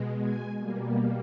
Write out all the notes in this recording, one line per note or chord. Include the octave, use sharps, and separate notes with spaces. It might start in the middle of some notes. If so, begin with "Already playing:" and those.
Already playing: B2 G#3
G#5
B2 G3 A#3